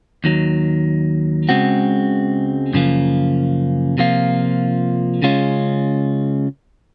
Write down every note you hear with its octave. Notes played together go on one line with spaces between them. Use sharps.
D#2 D#3 F#3
C#2 C#3 G#3 C4 F#4
F#2 C#3 F3 A#3
C3 F3 A#3 F4
C#3 G#3 C#4 F4